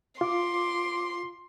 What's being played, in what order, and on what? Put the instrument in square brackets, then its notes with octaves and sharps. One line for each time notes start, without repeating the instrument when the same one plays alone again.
[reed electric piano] F4 [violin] C6 [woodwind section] D6